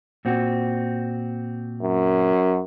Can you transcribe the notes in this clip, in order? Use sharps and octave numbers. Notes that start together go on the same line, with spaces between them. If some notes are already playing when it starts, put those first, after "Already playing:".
A#2 C4 F#4
F#2